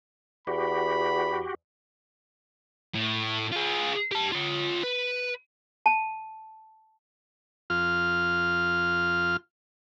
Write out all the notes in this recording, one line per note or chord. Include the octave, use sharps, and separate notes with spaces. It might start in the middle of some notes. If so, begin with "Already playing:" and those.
E2 F#4 G4 B5
A2
F4 G#4
G4 A5
F4 C#5
B4
A5
F2 F4 F6